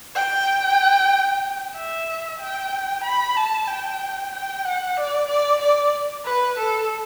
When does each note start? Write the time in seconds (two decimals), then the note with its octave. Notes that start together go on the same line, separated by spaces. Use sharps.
0.15 G5
1.75 E5
2.40 G5
3.04 B5
3.36 A5
3.68 G5
4.33 G5
4.65 F#5
4.97 D5
5.29 D5
5.62 D5
6.25 B4
6.58 A4